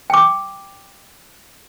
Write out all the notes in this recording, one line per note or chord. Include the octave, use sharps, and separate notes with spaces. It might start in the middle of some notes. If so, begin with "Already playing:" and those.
G5 D6